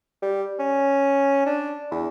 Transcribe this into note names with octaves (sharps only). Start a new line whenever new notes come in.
G3
C#4
D4
E2